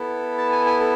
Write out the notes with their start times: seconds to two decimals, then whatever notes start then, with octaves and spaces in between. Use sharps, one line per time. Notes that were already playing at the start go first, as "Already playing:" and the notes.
Already playing: B3 E4 A4
0.38 A5
0.52 G#5
0.66 G#5
0.80 A4